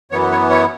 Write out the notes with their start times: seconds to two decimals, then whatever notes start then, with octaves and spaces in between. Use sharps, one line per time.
0.11 F#2 E3 B3 C#5
0.31 C#5
0.50 C#5